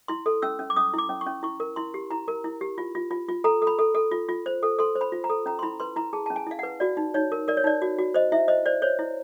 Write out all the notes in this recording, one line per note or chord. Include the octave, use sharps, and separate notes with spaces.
E4 C6
A4
C#4 E6
C#4
D6
C#4 D#6
E4 D6
C#4
C#6
C#4
E4 C#6
A#4
E4 C6
G4
E4 A#5
A#4
E4
G4
F4
F4
F4
F4
A4 A#5
A4
B5
A4
A4
F4
F4
C5
A4
A4 C6
C5
B5
F4
A#5
A4
C#4 A#5
C6
E4 B5
B4 C6
E4 A#5
G#4 A5
C#4 A5
G#5
E4 F5
F#5
B4
F#4 D5
D#4
D#4 C#5
A#4
A#4 D5
C#5
D#4 D5
F#4
F#4
C5 D#5
E4 E5
C5 D#5
C5 D5
C5 C#5
E4